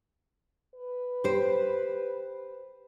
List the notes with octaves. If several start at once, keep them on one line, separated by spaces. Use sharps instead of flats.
B4
G4 C5